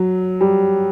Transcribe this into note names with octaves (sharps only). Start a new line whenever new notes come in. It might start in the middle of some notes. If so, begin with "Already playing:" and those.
Already playing: F#3
G3